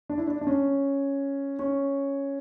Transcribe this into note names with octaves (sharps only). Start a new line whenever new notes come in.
D4
E4
D4
D4
C#4
C#4